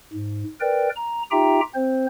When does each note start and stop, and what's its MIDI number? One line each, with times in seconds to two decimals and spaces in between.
0.13 0.43 44
0.60 0.89 70
0.60 0.89 71
0.60 0.89 74
0.60 0.89 79
0.96 1.23 82
1.31 1.61 63
1.31 1.61 65
1.31 1.61 67
1.31 1.61 76
1.31 1.61 79
1.31 1.61 82
1.75 2.07 60
1.75 2.07 72